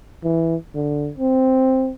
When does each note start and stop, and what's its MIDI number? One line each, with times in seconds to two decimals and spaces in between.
0.24 0.56 52
0.75 1.10 50
1.18 1.92 60